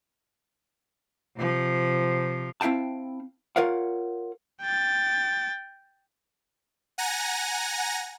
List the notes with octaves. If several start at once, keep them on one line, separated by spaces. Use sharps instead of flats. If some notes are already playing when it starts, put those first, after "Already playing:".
C3 F3
C4 E4 F5 G5 A5
F4 A#4 C#5 F5 F#5
G5 A6
F#5 G#5 A#5 A#6